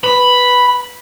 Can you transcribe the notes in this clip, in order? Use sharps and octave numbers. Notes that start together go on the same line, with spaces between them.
B4 B5